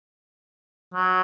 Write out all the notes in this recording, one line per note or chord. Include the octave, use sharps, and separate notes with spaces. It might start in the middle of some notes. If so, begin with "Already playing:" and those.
F#3